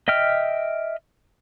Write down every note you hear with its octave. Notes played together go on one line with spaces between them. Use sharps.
D#5 E5 G5 F6